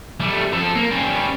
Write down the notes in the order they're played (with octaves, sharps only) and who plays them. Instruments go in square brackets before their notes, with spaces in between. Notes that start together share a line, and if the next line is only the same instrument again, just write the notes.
[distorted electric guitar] G3 A3
F3 A4
A#3
G3 C#4